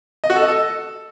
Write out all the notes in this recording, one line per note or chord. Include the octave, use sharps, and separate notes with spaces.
D#5
F#4
A4
D#5
A4